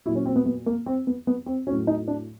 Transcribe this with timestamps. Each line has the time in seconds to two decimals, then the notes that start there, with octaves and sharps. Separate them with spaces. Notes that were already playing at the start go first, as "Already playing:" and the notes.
0.06 A#2 F#3 E4
0.15 C#4
0.26 C4
0.36 B3
0.46 B3
0.66 A#3
0.86 C4
1.07 B3
1.27 B3
1.46 C4
1.67 A2 F#3 C#4
1.87 D#4
2.08 D4